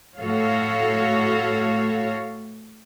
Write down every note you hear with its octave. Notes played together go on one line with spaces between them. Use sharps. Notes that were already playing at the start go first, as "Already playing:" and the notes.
A2 A3 F#4 A4 C#5 F5